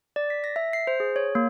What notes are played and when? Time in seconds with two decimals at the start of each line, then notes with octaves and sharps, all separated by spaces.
0.16 D5
0.30 B6
0.44 A#6
0.56 E5
0.73 C7
0.87 C5
1.00 G#4
1.16 C#5
1.35 A#3